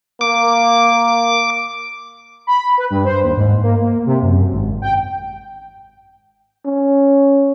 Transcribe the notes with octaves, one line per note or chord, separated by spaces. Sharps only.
A#3 D6
B5
B4
G2
C5
D#2
G#2
A#3
A#3
C3
F#2
G#1
G5
C#4